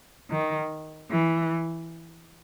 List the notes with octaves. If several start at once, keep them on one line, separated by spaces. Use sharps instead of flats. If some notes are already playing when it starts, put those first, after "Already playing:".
D#3
E3